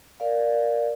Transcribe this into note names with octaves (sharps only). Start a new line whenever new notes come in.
A#4 D5 F5